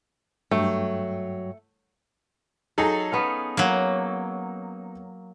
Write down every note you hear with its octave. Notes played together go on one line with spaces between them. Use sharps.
G2 F#3 A3 G5
F#3 D#4 G#4 A4
B3 C#4 F5
F#3 A#3